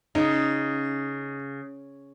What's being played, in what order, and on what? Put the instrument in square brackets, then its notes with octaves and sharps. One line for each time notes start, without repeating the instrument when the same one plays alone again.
[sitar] C#3 [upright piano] D#4